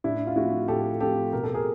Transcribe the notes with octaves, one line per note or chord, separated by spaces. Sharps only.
A2 D4 E4
F4
F3 A3 C4 E4 F#4
A2 G4 A4
F3 A3 C4 G4 A4
B2 A#4
A4
G#4 A#4